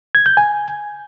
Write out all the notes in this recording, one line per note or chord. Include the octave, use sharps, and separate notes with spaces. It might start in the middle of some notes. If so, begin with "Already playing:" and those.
G#6
G6
G#5